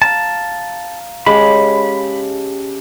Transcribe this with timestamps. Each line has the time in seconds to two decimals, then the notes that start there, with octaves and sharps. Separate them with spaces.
0.02 F5 A5 A#5
1.26 C#3 G#3 G4 A5 B5